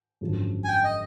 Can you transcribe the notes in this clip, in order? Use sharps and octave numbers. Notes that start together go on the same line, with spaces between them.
G#1 F#2 D3 F3 G#3
G#5
G5
D#5